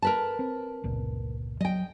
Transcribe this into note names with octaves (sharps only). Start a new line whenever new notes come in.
A#4 B4 A5
C4
G1 C#2 A#2
F#3 D#5 G5